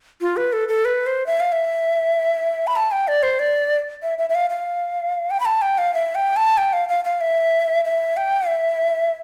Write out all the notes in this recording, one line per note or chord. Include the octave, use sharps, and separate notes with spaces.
F4
B4
A4
A4
B4
C5
E5
F5
E5
B5
A5
G5
D5
C5
D5
E5
E5
E5
F5
F5
G5
B5
A5
G5
F5
E5
G5
A5
G5
F5
F5
F5
E5
E5
G5
E5